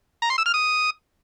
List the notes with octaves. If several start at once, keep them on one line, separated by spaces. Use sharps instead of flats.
A#5
C6
E6
F6
D#6